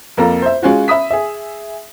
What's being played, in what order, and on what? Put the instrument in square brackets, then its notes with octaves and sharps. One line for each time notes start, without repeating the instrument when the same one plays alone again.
[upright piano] F2 A#3 A4 A#5
C5 E5
G#3 C#4 F4 F#4
E5 B5 D#6 B6
G#4 E5